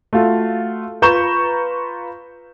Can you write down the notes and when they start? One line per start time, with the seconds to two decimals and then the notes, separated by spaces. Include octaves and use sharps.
0.13 A3 F4 F#4 F5
1.02 F4 B4 A#5 C#6 G6 E7